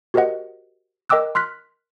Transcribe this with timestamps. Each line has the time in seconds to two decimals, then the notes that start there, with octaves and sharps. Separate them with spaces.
0.14 F#4 G4 A#4 C5 D#5 F#5
1.09 A#4 D#5 G5 D6 E6 F#6
1.35 C6 F6 F#6 B6